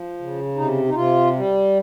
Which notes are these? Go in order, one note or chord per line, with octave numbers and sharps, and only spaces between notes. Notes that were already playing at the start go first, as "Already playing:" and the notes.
Already playing: F3
C#3
C3 D#4
D#4
C3 F4
G3